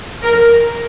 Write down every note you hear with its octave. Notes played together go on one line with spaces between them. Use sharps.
A#4